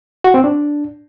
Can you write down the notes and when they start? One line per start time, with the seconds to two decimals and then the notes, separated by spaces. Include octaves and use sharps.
0.24 F#4
0.34 C4
0.44 D4